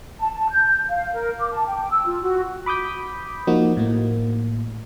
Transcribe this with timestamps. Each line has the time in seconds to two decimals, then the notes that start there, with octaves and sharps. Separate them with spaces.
0.19 A5
0.33 A5
0.49 G6
0.89 F5
1.13 A#4
1.39 D6
1.52 A5
1.66 G5
1.91 E6
2.06 F4
2.22 F#4
2.66 B5 D6 D#6 G6 B6
3.47 F3 A#3 D#4 F#4
3.77 A2 A#3